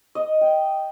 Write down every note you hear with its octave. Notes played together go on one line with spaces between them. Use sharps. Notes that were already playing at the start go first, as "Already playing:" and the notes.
D#5
G5